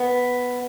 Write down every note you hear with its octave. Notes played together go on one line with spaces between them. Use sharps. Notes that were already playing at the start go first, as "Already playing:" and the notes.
Already playing: B3